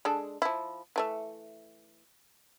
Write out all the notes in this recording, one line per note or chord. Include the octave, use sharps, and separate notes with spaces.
G#3 D4 A4
F3 E4
E3 A3 E5